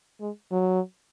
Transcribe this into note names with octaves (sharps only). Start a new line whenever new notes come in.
G#3
F#3